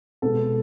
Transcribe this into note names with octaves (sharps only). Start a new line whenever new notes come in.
B2 G#3 B3 A4